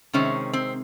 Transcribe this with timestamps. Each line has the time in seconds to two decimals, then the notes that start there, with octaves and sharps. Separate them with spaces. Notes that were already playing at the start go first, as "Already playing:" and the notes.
0.13 C3 D#3 G#3 C4 C#4
0.53 C4